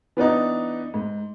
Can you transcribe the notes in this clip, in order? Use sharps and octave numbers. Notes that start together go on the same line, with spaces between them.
E3 B3 D4 D#4
G#2